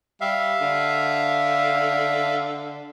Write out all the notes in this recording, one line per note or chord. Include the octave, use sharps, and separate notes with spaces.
G3 E5 F5
D3